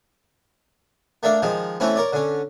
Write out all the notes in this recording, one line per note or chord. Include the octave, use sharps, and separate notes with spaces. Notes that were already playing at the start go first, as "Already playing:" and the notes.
A3 A#3 D4 E5 F5
D#3 F3 G#3
E3 A3 C4 C#4 E4
A#4 C#5 D5
D3 C#4